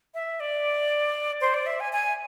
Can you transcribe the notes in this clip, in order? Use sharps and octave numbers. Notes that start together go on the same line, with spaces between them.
E5
D5
C5
D5
E5
G#5
G#5